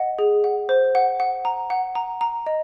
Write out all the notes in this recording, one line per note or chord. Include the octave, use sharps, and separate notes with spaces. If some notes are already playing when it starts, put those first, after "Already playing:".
Already playing: D#5 F#5
G#4
F#5
C5
F#5
F#5
A#5
F#5
A#5
A#5
D#5